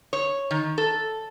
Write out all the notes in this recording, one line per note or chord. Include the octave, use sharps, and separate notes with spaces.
C#5
D#3
A4